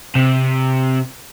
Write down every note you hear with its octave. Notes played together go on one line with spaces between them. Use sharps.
C3